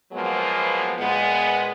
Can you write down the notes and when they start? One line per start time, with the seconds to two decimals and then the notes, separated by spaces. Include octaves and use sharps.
0.12 F3 F#3 G#3 A#3 B3
0.98 A#2 G#3 B3